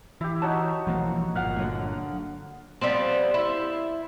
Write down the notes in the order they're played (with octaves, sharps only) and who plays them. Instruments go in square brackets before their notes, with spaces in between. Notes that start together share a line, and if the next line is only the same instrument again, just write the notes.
[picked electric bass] E3 [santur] E4 G4
[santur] D#4 F#4 C#5 [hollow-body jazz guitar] A5
[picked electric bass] B1 E3 A#3 [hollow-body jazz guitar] F3
[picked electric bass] G1 A#2 [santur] F5 F#5
[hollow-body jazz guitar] D3 F#3 A#3
[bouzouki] F3 G3 B3 C4
E4 C5